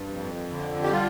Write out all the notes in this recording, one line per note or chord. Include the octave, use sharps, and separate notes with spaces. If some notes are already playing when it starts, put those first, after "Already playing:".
Already playing: G2
F2
D3
G4
G3 F4